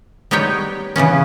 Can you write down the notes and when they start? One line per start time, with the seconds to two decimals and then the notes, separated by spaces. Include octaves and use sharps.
0.31 G3 B3 D#4 G4 C#5 G5
0.96 C#3 E3 B3 C#4